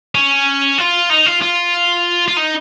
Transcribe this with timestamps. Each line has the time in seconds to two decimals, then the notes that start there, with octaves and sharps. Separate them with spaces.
0.15 C#4
0.78 F4
1.10 D#4
1.26 F4
1.42 F4
2.28 F4
2.37 D#4